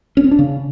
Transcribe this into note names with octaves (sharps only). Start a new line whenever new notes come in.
C#4
C4
D4
C#3